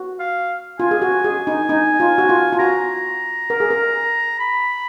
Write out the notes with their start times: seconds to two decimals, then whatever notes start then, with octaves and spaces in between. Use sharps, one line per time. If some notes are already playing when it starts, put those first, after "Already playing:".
Already playing: F#4
0.20 F5
0.80 F4 G#5
0.91 G#4
1.02 F#4
1.24 G#4
1.47 D#4
1.69 D#4
2.00 F4
2.18 F#4
2.29 F4
2.53 F4
2.59 F#4 A#5
3.50 A#4
3.60 G#4
3.71 A#4
4.40 B5